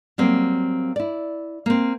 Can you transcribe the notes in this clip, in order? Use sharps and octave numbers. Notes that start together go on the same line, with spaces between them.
F#3 G3 A#3 C4
E4 D5
A#3 C4